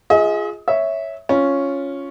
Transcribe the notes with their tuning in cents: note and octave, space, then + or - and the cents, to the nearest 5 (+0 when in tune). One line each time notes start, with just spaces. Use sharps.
F4 +0 G#4 +0 D#5 +40
C#5 +0 E5 -10
C#4 +0 F4 +0